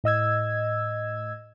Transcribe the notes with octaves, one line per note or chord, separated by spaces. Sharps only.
A2 D#5 E6 G#6